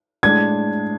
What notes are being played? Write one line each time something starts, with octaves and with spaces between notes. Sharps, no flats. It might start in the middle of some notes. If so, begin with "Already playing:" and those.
A2 G#3 D4 G#6